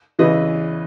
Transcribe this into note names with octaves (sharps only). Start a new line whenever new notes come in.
E2 C#3 E3 B4 D#5